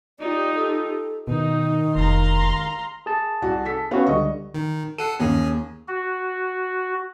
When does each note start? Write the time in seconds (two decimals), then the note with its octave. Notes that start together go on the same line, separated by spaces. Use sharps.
0.20 D#4 F4 G4 D5
0.55 A4
1.27 B2 D#3 D#4
1.96 F1 F5 A#5 C6
3.06 G#4 A5
3.42 C2 F#4
3.65 A4 B6
3.91 B3 C#4 F#4 F5
4.07 C#2 D3 G3 D#5 C#6
4.54 D#3
4.98 A4 F#5 C7 D#7
5.20 D#2 C#4 G#4
5.88 F#4